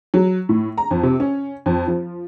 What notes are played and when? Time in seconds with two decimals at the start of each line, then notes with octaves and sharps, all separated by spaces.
0.14 F#3
0.49 A2
0.78 A#5
0.91 F2
1.03 C3
1.20 C#4
1.66 F2
1.87 F3